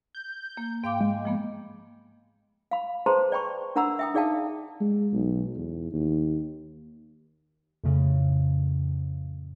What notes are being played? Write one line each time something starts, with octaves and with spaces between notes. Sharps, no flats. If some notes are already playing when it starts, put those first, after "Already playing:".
G6
A#3
G#2 F5 G5 D6
G#3
F3 A#3 B3
F5 B5
G#4 B4 C5 A5 A#5 C6
D5 G5 B5 C#6
D4 A#4 F#5 A#5 B5 E6
E5 G5 D#6
D#4 G#4 D5 F5 G5 A5
G#3
B1
E2
D#2
F2 A2 C#3